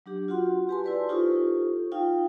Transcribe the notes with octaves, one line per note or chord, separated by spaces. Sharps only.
F#3 D4 G4
F4 F#4 F#5 C6
F#4 G4 B4 G#5 A5 C6
E4 B4 D5
D#4 F4 G4 A4 C5 C#6
D#4 F4 F5 G5